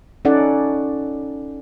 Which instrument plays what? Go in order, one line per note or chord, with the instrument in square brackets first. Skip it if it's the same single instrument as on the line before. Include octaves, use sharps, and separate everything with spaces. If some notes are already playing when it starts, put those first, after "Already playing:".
[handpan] C#4 D#4 A4 D5 F#5